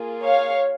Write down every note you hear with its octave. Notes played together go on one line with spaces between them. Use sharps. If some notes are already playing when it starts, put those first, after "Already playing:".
Already playing: A#3 F4 G#4
C#5 F5